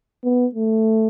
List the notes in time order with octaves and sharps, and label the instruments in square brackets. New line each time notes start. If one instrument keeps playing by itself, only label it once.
[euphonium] B3
A3